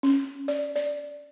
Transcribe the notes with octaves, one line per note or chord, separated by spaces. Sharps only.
C#4
D5
D5